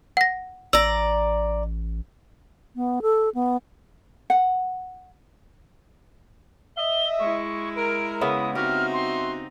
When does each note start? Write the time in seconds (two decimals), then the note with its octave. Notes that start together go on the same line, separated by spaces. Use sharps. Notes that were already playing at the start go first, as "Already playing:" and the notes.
0.17 F#5 A#6
0.73 A1 D5 A#5 E6
2.76 B3
3.02 A4
3.35 B3
4.30 F#5
6.77 D#5 E5 G7
7.19 G#3 E4 C#6
7.76 A#4 D7
8.21 C#3 B3 E5 D#6
8.55 C4 D#4 F#4 G4 E5 F6
8.93 C6